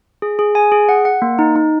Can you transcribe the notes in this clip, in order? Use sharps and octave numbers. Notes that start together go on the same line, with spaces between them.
G#4
G#4
G#5
G#4
F#5
F#5
A#3
D#4
D#4